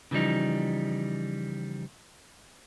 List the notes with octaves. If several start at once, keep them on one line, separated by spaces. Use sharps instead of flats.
C#3 E3 F3 G3 D#4